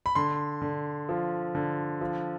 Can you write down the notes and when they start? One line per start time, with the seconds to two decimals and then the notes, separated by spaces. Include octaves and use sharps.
0.06 B5
0.15 D3 C6
0.62 D3
1.09 F3
1.55 D3
2.01 F3